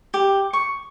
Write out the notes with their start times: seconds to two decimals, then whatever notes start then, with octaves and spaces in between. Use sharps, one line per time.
0.14 G4
0.53 C#6